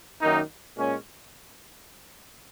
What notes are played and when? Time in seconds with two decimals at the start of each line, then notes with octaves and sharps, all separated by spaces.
0.21 F#2 D#3 A#3 D#4
0.76 A#2 G#3 C#4